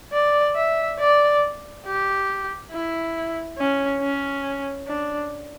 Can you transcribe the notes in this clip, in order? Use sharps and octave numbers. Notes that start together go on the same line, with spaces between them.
D5
E5
D5
G4
E4
C#4
C#4
D4